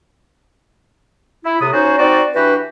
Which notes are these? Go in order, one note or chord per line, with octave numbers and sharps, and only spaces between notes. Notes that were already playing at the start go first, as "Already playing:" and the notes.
E4
A2 C3 B3 D#6
C#4 D#4 F#4 C5 C#5
C4 D#4 F#4 D5
E3 D4 F#4 G4 B4